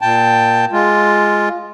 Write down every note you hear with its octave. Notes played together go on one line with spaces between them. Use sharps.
A#2 G5 A5
G#3 F4